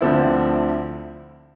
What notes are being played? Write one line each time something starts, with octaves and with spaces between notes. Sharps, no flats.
D2 D3 F3 C4 E4